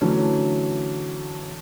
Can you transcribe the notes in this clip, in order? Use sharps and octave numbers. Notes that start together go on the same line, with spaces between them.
D3 E3 F#3 A3 C#4